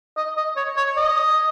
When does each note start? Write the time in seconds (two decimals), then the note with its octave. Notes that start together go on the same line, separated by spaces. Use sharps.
0.17 D#5
0.37 D#5
0.56 C#5
0.77 C#5
0.97 D#5